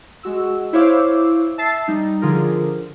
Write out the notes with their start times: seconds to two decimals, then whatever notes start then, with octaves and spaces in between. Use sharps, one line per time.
0.23 G#3 F#4 E6
0.73 E4 C5 C#5 F5 D6 E6
1.58 E5 A5 E6 A6 C7
1.88 G3 D#4
2.22 D3 F3 F4 G#4 A#4